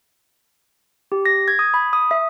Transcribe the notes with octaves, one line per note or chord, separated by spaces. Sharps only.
G4
A#6
G#6
D#6
B5
D#6
E5